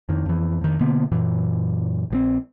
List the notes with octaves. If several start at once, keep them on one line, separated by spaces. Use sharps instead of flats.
F2 D#3
F2 E3
F2 D#3
B2 D3 A#3 B3
F#2 A#2 E3
A#1 F3 C4